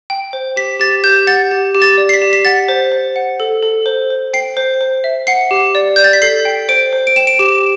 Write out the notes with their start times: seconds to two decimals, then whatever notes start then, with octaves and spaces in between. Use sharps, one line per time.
0.10 G5
0.33 C5
0.56 G4 B6
0.80 G4 A6
1.04 G4 G6
1.27 F#5 A6
1.51 G4
1.75 G4
1.82 A6
1.97 D5
2.09 C7
2.14 B6
2.22 G4
2.33 B6
2.45 F#5 A6
2.68 C5
2.92 C5
3.16 F#5
3.40 A4
3.63 A4
3.86 C5
4.10 C5
4.33 G5 C7
4.57 C5
4.81 C5
5.04 E5
5.27 F#5 C7
5.51 G4
5.75 D5
5.96 D5 G6
6.04 A6
6.13 B6
6.22 A4 C7
6.45 G5
6.69 C5 D7
6.93 C5
7.07 D7
7.16 G5 E7
7.27 D7
7.39 G4 E7